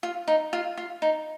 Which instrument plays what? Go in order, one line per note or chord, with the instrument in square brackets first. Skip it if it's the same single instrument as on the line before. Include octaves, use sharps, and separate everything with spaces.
[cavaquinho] F4
D#4
F4
F4
D#4